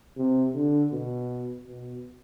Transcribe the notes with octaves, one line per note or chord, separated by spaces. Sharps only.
C3
D3
B2
B2